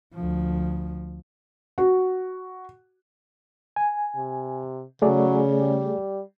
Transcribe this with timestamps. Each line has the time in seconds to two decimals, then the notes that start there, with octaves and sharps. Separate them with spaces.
0.14 D2 F3
1.78 F#4
3.76 G#5
4.16 C3
5.02 C#3 F#3 A3 G#4 D5
5.59 G3